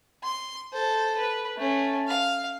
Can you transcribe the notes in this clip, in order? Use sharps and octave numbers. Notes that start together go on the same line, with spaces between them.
C6
A4 C5
B4
A3 C#4
F5